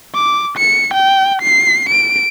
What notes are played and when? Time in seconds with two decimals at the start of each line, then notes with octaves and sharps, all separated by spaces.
0.14 D6
0.58 C#7
0.94 G5
1.42 C7
1.89 D7